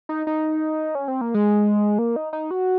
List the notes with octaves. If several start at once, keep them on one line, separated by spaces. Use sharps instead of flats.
D#4
D#4
C#4
C4
A#3
G#3
A#3
D#4
D#4
F#4